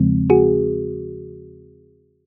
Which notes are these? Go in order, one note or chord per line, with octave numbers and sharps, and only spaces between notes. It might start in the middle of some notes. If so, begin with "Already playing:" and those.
Already playing: E2 C#3 F3 G#3 C4
F#4 G#4